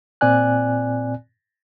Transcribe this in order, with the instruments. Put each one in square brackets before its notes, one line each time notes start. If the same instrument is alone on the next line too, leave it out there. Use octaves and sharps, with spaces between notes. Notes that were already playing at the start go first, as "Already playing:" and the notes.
[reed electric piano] A#2 C4 D5 G#5 F#6